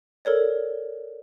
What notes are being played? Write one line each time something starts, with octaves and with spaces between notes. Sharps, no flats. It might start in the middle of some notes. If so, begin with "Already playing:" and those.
A4 A#4 C#5 D5